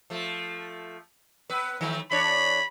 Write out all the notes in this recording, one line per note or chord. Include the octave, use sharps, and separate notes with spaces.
F3 A3
B3 B4
D#3 F#3 A3
E2 D4 C#5 B5